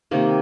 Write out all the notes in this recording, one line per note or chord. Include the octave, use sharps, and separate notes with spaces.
C3 D#3 A#3